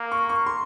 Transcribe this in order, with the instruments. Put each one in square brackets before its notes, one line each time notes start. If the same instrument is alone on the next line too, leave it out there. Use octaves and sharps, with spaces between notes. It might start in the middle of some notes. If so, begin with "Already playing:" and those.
Already playing: [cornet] A#3
[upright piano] C#6
C#6
C6